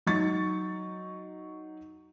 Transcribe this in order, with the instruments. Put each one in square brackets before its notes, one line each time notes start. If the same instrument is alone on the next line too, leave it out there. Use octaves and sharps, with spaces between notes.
[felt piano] F#3 D#4 C#6 A6